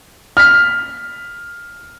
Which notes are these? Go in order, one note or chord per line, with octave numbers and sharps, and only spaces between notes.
F6 B6